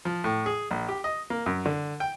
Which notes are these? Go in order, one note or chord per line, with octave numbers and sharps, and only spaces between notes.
F3
A2
G#4
A#1
G4
D#5
A#3
F#2
D3
G5